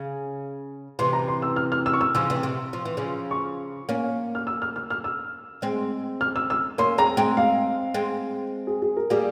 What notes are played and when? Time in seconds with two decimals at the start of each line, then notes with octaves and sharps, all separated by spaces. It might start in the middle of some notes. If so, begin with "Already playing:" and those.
Already playing: C#3
0.99 C3 E3 C6
1.13 A#5
1.28 C6
1.42 E6
1.56 F6
1.72 F6
1.86 E6
1.93 C#6
2.01 E6
2.15 C#3 F3 E6
2.30 C3 E3
2.43 C3
2.73 F3
2.85 E3
2.97 C#3 F3
3.31 C#6
3.89 A#3 C#4
4.35 F6
4.47 E6
4.62 F6
4.76 F6
4.90 F6
5.04 E6
5.62 G#3 C4
6.21 F6
6.36 E6
6.50 E6
6.78 A#3 C#4 C6
6.98 G#3 C4 A#5
7.17 G#3 C4 G5
7.37 F5
7.94 G#3 C4
8.67 G#4
8.82 G#4
8.97 A#4
9.10 G3 A#3 G#4